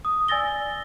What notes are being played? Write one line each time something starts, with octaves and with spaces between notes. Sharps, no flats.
D#6
D5 G#5 E6 A6 A#6 G7